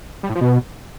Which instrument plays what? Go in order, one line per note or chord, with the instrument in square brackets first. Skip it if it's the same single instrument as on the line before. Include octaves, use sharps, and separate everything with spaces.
[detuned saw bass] G3
A2
F3
B2